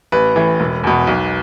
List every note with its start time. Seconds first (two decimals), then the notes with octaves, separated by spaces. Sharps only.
0.12 A1 B4
0.36 A2 E3
0.60 E1
0.84 E2 B2
1.07 B1